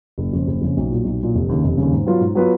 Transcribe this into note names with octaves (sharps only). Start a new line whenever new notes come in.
F#1
F2 C#3
F#1
F2 C#3
B1
A#2 F#3
B1
A#2 F#3
F1
D#2 C#3
F1
D#2 C#3
G#2
F#3 B3 F4 B4
G#2
F#3 B3 F4 B4